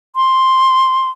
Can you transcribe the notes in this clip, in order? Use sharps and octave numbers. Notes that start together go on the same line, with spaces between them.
C6